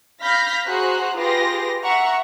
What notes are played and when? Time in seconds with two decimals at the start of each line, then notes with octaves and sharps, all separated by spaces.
0.23 F5 B5 F6 G6 A#6 B6
0.67 F#4 G#4 C5 A#5 F#6
1.19 F4 G4 G#4 B4 C6 A#6
1.84 E5 F#5 A#5 C#6